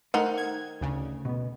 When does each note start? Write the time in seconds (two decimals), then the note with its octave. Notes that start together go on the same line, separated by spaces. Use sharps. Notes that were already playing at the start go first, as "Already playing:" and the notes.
0.14 D#3 A3 D#4 C5 D#5 F5 F#5
0.37 G#6
0.81 D2 C#3
1.25 B2 B3